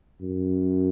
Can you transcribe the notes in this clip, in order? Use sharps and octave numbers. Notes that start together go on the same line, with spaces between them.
F#2